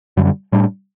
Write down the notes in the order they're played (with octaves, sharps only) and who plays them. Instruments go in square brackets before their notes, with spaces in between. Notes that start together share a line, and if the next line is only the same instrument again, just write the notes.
[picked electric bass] F#2 D3 G3
A2 G3 D4